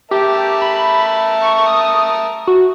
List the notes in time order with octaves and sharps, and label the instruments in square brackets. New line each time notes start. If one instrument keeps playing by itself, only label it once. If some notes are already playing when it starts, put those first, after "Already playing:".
[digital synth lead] G4 [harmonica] A#4 E5 A5
[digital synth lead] B5
C#6
D#6
F#4